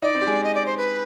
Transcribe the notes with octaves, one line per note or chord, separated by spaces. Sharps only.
D#4 D5 D#5
C4 C5
G4
G#3 G#4
D#5
D5
C5
B4